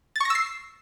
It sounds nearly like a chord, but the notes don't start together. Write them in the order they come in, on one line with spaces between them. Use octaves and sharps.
A6 C#6 A#6 E6 C7